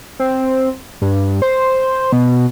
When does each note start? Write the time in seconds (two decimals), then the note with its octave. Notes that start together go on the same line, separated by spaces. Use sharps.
0.20 C4
1.02 G2
1.42 C5
2.12 B2